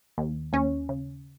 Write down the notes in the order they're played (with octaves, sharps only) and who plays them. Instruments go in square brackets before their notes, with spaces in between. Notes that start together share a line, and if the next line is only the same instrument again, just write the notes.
[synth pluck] D#2
D#2 C#4
C#3